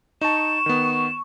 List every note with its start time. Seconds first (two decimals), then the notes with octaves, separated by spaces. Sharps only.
0.21 D#4 A5 C#6 E7
0.66 D#3 B3